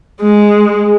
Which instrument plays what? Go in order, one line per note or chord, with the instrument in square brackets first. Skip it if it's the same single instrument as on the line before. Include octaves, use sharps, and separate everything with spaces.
[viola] G#3